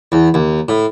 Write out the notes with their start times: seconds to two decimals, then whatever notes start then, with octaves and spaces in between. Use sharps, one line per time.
0.12 E2
0.34 D#2
0.69 A2